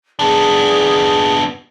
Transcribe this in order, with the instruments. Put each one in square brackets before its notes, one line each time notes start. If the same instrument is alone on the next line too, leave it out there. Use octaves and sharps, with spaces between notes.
[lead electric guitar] B3 D4 [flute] G#4